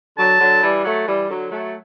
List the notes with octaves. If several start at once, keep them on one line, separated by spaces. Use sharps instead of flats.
D3 F#3 A5
D3 F#3
E3 G3
F#3 A3
E3 G3
D3 F#3
F#3 A3